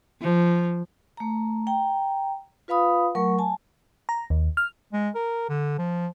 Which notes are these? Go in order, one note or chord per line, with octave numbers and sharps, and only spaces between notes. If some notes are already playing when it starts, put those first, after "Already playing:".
F3
A3 A#5
G5 A#5
F4 B4 F5 B5 D#6
F#3 A3 A#4 C#6
G#5 A5
A#5
D#2
F6
G#3
A#4
D3
F3